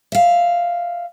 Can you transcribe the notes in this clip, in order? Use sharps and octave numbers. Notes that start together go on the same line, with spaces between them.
E5 F5